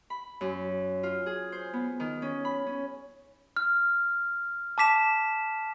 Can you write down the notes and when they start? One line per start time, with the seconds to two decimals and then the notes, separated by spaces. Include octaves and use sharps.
0.10 B5
0.41 F#2
1.03 F4
1.26 G#4
1.52 C5
1.73 B3
2.00 D#3
2.22 C#4
2.45 B5
2.66 C#4
3.57 F6
4.78 A5 D6 B6 E7